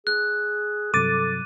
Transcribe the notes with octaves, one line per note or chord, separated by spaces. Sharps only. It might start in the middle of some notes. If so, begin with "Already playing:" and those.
G#4 F#6
G2 C3 F#3 A4 D6 A6 D#7